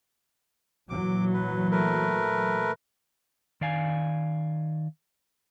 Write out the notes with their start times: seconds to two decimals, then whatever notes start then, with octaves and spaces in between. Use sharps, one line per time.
0.90 A#2 E3 F#3 D6
1.33 B4
1.71 A3 A#4 B4
3.61 D#3 D5 F5 G#5